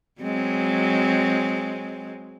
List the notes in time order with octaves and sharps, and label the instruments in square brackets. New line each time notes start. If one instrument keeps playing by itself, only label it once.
[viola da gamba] F#3 G#3 C4